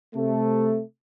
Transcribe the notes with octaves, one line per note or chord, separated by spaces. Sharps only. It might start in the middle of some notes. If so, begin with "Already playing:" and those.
C3 A3